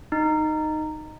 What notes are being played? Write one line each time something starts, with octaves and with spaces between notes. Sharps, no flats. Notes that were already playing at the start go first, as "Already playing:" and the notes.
D#4